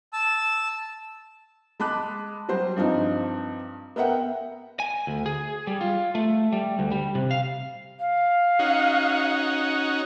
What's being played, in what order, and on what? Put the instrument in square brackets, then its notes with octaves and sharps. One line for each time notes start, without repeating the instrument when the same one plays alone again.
[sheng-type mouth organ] A5 E6
[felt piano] G#3 A5 B5 D6 F#6
F#3 G3 C5
G2 F3 C4 D#4
B3 A#4 E5 F#5 G5
[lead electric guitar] G#5
D2
G#4
G3
F4
A3
G3
D2
G3
C3
F5
[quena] F5
[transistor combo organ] C#4 D#4 F#4